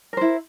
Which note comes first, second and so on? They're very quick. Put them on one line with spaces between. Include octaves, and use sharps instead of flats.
A#4 C5 E4